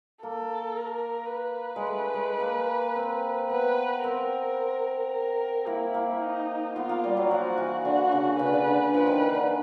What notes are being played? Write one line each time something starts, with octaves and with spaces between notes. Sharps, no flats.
A#3 A4
A#4
B4
G#3
A3
G#3
A#3
C4
B3 B4
C4 A#4
A#4
A#3 E4
A#3
D#4
B3 F4
A#3
G3
F#3
F3 F#4
E3
D3 F#4
C#3
C#3 B4
D3
C#3
D3
F3 B4
D#3
E3
D3